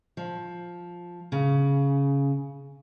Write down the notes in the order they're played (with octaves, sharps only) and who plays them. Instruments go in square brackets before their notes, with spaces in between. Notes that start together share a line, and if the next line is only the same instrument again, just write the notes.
[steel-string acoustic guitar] F3
C#3